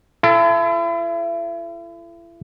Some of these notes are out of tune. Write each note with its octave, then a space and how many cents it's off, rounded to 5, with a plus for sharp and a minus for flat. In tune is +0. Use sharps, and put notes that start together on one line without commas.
E4 +40 A4 +0